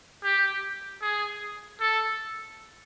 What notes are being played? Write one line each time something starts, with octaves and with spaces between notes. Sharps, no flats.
G4
G#4
A4